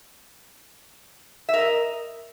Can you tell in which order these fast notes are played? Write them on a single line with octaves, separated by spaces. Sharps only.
E5 A#4 D#5